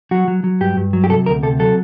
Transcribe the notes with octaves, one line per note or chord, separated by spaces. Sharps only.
F#3 F#4
F#3
F#3
G2 G4
G2
F#3
G4
C3 A4
D2 A#4
C3 A4
F#3 A4